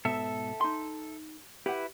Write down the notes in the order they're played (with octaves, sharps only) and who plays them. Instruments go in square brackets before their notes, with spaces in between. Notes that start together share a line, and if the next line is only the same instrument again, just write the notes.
[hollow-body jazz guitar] G#2 B2 [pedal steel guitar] A4 E5
[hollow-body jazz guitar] D#4 C6
[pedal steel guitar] E4 B4 [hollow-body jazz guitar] G4 F#5